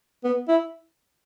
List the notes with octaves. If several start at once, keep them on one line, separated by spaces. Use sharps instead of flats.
B3
E4